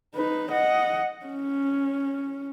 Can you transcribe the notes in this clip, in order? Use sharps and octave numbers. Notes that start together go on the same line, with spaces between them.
D#4 B4
D#5 F#5
C#4